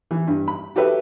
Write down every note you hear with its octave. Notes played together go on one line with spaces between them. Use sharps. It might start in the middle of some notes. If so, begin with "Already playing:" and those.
E3
G2
B5
F#4 G4 A4 B4 E5